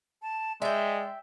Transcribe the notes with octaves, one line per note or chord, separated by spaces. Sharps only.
A5
G#3 D5 E5 G5